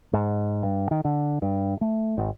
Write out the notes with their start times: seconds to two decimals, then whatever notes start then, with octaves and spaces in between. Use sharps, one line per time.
0.13 G#2
0.63 G2
0.91 D#3
1.05 D3
1.42 G2
1.81 A3
2.17 G#1